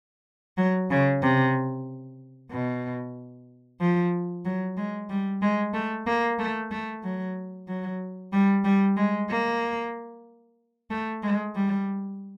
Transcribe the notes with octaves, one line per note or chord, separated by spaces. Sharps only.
F#3
C#3
C3
B2
F3
F#3
G#3
G3
G#3
A3
A#3
A3
A3
F#3
F#3
G3
G3
G#3
A#3
A3
G#3
G3